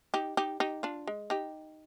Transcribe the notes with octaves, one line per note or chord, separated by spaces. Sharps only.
D#4 G4
D#4 G4
D#4 G4
D4 F4
G#3
D#4 G4